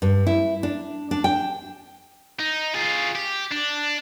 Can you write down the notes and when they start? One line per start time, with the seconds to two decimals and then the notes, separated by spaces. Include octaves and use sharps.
0.02 G2
0.27 E4
0.63 D4
1.11 D4
1.24 G5
2.39 D#4
2.74 F4 G#4
3.15 G4
3.52 D4